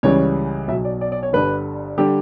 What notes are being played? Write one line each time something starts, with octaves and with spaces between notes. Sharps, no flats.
C#2 C#3 E3 G3 C#5
B1 B2 F#3 E5
D5
D5
D5
C#5
G1 G2 D3 G3 B4
D3 G3 G4